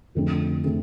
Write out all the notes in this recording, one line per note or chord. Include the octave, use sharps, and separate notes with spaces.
F2 D3 A3 C4
D3 A3 C4